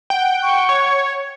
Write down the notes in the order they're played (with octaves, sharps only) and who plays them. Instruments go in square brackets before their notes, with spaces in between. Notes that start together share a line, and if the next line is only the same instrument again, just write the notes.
[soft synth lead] F#5 [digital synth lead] G5
[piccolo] C#6
[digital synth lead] C#5